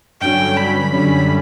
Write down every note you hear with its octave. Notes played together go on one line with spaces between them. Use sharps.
G2 D3 F#3 C#4 G5
B5
F#2 D3 G3 C#4